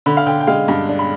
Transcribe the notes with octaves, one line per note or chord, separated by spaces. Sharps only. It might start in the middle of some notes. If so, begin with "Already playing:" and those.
D3 B5
F5
D3 G5
G5
G#3 F5
G2
D4
B5